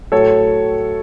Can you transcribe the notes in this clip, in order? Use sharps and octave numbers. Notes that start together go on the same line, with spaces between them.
A2 F#3 A4 C#5